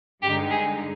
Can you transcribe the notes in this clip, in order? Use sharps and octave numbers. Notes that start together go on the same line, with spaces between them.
G2 D3 G#3 D#4 G4
G#4